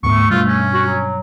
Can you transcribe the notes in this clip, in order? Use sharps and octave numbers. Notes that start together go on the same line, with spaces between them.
D2 G#2 A3 B3 C#6
G2 B2 G3 F4
C#4
F#4
F#3